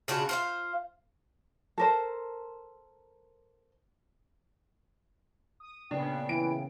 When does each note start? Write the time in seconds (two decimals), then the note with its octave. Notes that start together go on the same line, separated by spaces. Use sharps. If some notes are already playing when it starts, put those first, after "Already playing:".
0.08 C#3 D4 F4 F#4
0.29 F4 C5 F5
1.78 A4 A#4 C5
5.60 D#6
5.91 A#2 C#3 B3 D4 G5
6.29 E3 D7